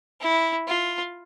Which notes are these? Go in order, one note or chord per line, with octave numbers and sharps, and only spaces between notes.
E4
F4